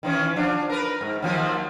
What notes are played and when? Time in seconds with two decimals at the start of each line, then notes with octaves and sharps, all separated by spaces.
0.03 D#3 E3 C#4
0.36 F3 D4
0.69 A#4 B4
1.01 G#2
1.22 D#2 F3 F#3